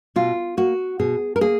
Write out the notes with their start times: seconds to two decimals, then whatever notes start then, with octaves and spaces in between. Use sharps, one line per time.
0.16 B2 F4
0.57 A#3 F#4
0.99 B2 G#4
1.36 A#4
1.41 A#3 G#4